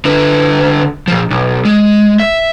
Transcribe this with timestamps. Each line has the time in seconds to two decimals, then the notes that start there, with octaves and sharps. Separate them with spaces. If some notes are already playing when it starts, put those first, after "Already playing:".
0.05 D3 B4
1.08 A#2 F3
1.30 B1
1.65 G#3
2.20 E5